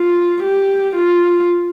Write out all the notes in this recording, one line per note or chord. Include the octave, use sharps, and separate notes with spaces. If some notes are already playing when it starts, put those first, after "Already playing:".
Already playing: F4
G4
F4